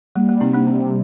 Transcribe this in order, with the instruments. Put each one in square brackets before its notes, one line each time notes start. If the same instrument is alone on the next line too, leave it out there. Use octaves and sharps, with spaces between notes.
[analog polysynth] G3 [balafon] A#3
[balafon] A#3
[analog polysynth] C3 [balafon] C4 D#4
[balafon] A#3 D4
[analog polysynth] C3 [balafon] C4